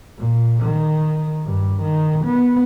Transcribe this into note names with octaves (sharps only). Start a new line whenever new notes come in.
A#2
D#3
G2
D#3
B3